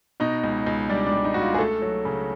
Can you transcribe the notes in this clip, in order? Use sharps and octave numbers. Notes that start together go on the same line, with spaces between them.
B2 D#4
C#2
C#2
G3 D4
D4
G3
D#4
C#2 F#4
F4
G#4
A3 A4
F#3
C#3